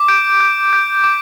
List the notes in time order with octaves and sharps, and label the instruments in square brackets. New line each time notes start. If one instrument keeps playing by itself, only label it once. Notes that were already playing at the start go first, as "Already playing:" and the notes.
Already playing: [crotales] D6
G6 D7
G6
G6
D6